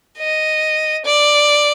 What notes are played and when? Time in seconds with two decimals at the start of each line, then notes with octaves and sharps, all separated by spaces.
0.19 D#5
1.05 D5